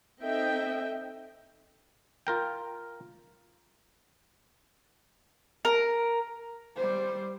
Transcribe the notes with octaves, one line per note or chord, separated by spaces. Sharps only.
C4 D#4 A4 D#5 E5 G5
F4 A#4 G5
A#4
G3 C5